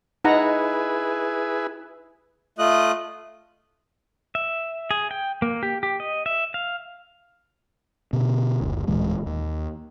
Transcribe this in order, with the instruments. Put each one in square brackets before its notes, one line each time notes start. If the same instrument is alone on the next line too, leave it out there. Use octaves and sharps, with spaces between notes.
[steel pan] D#4 F#5 A#5 [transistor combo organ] E4 G#4 B4
[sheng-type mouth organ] A3 F4 D#5 D#6 F#6
[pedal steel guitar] E5
G#4
G5
A#3
G4
G4
D#5
E5
F5
[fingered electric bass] B2 D3
F#1 D2
D1 A#2 E3 G#3
D#2